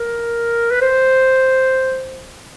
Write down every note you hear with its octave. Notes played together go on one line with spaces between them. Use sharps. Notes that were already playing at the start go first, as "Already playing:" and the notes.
Already playing: A#4
B4
C5